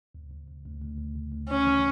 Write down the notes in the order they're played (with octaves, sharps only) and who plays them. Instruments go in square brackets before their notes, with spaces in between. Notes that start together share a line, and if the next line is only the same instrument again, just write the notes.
[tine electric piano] D2
D2
D2
D2
D2
D2
D2
D2
[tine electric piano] D2 [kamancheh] C#4
[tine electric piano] E3